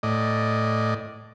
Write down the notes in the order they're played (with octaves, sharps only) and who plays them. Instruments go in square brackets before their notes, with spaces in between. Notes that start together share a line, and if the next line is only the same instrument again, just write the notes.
[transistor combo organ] A2 D5 D#5